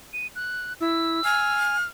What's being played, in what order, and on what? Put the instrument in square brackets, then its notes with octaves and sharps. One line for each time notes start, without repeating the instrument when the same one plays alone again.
[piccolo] D#7
F#6
[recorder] E4 [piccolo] E6
[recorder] G#5 [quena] F6